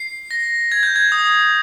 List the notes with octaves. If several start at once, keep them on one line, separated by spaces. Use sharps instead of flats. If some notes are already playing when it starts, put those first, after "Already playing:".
Already playing: C7
A#6
G#6
G6
G#6
D#6